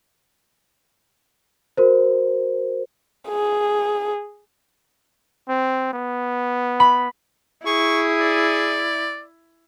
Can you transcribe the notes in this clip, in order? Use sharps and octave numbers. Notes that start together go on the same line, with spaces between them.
F#4 A#4 C5
G#4
C4
B3
B5
E4 G#4 C#6
D5